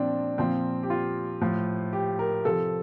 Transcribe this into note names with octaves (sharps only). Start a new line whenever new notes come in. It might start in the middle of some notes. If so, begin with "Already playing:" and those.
Already playing: A#2 F3 C4 D4
A#2 F3 C4
G4
F4
A2 F3
G4
A#4
C3 F3 A4